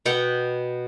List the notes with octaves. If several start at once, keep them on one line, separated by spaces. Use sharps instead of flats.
B2 B3 F#5 G5